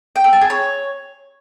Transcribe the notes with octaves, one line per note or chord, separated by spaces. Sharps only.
G5
A4
A5
G#4
C#5